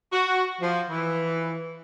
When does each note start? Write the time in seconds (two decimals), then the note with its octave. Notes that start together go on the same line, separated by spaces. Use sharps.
0.12 F#4
0.61 F3
0.90 E3